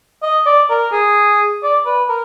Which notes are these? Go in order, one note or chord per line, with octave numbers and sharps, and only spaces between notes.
D#5
D5
A#4
G#4
D5
B4
A#4